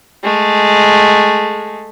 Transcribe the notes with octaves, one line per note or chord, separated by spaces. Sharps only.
G#3 A3